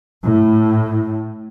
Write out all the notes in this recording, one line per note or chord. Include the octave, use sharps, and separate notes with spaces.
A2